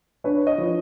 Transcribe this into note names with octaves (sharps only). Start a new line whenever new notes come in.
D4 B4 C#5
C#5 D#5
F3